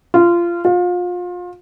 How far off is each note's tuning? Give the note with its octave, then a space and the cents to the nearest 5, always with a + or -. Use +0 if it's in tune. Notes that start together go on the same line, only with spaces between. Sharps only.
F4 -20
F4 +30